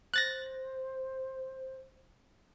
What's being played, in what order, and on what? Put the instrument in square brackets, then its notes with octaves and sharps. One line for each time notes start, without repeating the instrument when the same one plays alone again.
[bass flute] C5 [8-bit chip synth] F#6 A6 A#6